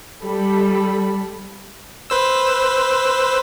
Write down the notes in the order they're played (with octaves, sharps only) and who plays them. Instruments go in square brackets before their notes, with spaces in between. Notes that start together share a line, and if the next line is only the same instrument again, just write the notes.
[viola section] G3 A4 B5
[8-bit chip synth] B4 C5 E6